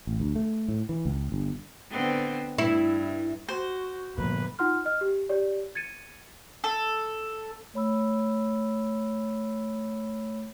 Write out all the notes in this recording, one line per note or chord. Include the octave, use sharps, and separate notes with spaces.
A1
D2
A3
A2
E3
C#2
G1
D3 B3 C4
G2 E4
F#4 C5
G1 A#2 F3 A#3 B4
D#4 F4 F#5 C6 F6
D#5 F6
G4
G4 C#5 D5
G#6 A6 C#7 D#7
A4
A3 C#5 B5 E6